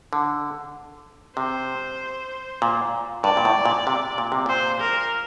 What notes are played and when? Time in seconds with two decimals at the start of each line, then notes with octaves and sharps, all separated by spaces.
0.13 D3
1.37 C3 C5
2.62 A#2
3.24 G2 D5
3.37 A#2
3.45 A2
3.66 A#2
3.87 C3
4.18 A#2
4.32 C3
4.46 A#2 C5
4.80 A#4